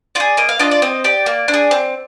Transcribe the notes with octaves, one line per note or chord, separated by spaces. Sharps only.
F4 G#4 D5
A#3 D#5
F5
D4 F4 D#5
D5
C4 D#5
G4 D5
A#3
D4
G#4
C4